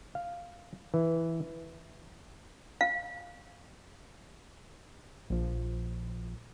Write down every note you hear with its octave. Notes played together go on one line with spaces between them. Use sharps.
F5
E3
F5
A#1 F3